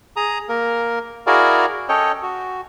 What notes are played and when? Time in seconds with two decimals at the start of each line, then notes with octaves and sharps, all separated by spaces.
0.16 G#4 A#5 D#6
0.49 A#3 A#4
1.27 E4 F#4 G#4 A#4 D5 F5
1.89 C#4 A4 C#5 D#5 G5
2.22 F#4